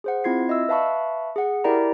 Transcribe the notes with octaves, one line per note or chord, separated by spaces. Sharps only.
G#4 C5 F#5
C4 E4 F4 G#6 C7
D#5 E5 E6
B4 E5 F5 A5 B5 C#6
G#4 F#5
E4 G4 A#4 D5 G5 A#5